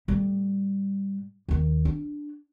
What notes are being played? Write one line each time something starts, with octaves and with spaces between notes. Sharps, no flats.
A2 G3
D#2 D#3
D4